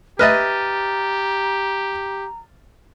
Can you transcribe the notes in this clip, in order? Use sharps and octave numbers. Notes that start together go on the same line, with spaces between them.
G4 B4 D#5 E5 A#5 F6 A6